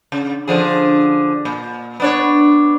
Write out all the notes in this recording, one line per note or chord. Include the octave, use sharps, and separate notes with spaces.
C#3
D3 F3 G#4
A#2
B3 D4 C#5